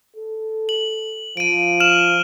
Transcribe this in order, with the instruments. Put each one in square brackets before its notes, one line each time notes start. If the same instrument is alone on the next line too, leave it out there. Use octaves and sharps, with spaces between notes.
[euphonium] A4
[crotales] F#7
[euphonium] F3 [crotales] D7 D#7
[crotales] F6 E7 F#7